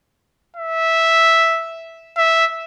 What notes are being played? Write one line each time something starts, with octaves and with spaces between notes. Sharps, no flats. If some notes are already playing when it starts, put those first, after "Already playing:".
E5
E5